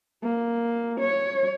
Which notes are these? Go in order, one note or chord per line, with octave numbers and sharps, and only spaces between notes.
A#3
C#5